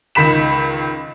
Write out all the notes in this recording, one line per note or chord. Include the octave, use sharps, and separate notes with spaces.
C#2 D#3 B5 B6 E7